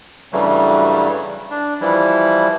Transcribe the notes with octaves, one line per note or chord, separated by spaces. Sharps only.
G2 C#3 E3 F#3 G3 A3
D4
E3 F3 G3 E4